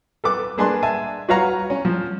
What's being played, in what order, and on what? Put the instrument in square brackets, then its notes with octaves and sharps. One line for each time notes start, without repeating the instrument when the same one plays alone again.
[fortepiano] A4 B4 D6
A#3 D4 G#4 B4 A5 C6
E5 G#5 A5
F#4 B4 C#5 F5 A#5
C#4
F3